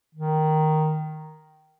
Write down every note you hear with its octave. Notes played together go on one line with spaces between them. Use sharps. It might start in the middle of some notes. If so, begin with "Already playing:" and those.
D#3